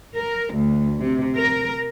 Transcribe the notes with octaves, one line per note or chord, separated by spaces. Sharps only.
A#4
D2
C3
A#4